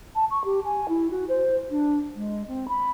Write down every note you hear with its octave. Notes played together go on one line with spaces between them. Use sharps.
A5
C#6
G4
G#5
E4
F#4
C5
D4
G#3
C4
B5